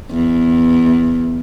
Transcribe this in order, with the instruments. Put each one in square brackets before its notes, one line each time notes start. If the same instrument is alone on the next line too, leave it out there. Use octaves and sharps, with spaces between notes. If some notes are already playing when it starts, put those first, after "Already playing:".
[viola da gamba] E2